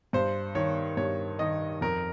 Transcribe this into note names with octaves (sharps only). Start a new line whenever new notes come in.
G2 C5
D#3 C#5
G2 C#5
D#3 D#5
F2 A#4